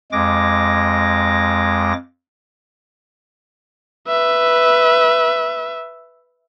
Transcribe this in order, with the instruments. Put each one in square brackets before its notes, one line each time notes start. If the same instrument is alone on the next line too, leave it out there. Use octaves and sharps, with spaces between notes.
[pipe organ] F2 G#3 D6 A#6
[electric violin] B4 E5